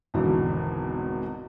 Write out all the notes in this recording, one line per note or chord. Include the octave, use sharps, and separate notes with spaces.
G#1 E2 B2 D3 E3 F#3